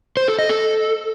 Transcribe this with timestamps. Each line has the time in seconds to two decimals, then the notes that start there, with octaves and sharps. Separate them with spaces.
0.17 C5
0.28 A4
0.39 D#5
0.49 A4